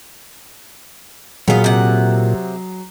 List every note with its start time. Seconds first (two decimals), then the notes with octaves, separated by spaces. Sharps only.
1.48 A#2 F#3 B3 F4 G#4
1.64 C3 F#5